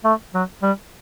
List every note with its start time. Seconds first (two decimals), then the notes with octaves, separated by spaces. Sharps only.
0.04 A3
0.34 F#3
0.62 G3